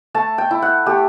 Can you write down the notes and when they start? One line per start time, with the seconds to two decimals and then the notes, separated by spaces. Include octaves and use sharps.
0.14 A3 A5
0.38 G5
0.51 E4
0.62 F#5
0.86 A3 G4